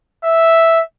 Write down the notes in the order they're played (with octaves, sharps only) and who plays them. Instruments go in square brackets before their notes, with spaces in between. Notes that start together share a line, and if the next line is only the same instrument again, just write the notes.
[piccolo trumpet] E5